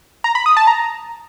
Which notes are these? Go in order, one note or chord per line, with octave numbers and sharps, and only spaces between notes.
A#5
B5
D#6
A5
A#5